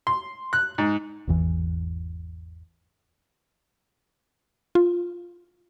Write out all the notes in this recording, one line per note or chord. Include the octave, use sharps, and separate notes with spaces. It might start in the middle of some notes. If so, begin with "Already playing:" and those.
C6
F#6
G#2
G#1 E2 E3
F4